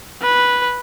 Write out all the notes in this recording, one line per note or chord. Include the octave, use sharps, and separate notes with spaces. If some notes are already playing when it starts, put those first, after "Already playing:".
B4